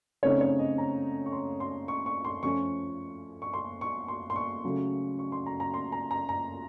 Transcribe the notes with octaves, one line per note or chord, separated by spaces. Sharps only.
C#3 A3 C4 D#4 C#5
C#5
D#5
A#5
C#6
C6
C6
C#6
C#6
C6
F3 A3 C#4 C#6
C#6
C6
C#6
C6
C6
C#6
C#3 F#3 A3
C#6
C6
A#5
A#5
C6
A#5
A#5
A#5